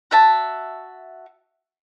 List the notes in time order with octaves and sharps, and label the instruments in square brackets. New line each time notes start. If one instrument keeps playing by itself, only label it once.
[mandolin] F#4 E5 A5